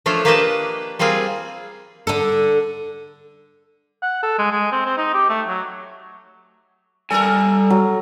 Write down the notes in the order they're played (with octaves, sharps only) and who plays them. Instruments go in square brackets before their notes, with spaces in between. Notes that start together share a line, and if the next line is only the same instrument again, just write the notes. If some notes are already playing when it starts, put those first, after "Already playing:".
[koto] F3 A3 D4 F4 C#5
A#3 D4 G4 B4 D#5 A5
G3 A#3 C4 F4 G#4
[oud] D3 A4
[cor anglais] F#5
A4
G#3
G#3
C4
C4
D#4
G4
A3
F#3
[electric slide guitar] G3 G#5 [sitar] A4 A#4
[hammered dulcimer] F#3